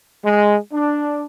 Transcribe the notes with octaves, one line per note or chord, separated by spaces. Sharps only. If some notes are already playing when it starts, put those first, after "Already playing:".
G#3
D4